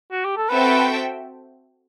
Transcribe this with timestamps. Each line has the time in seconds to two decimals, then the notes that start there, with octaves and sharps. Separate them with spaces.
0.12 F#4
0.25 G4
0.37 A4
0.49 C4 F#4 A4 B4 E5 G5